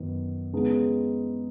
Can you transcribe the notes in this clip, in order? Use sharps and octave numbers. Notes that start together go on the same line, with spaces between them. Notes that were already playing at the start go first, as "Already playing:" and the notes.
Already playing: F#2 D#3 B3
C#3 G#3 B3 D#4